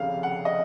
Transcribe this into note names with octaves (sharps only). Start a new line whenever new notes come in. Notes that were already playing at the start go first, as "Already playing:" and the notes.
Already playing: F1 D#2 C#3 F5
F#5
D#5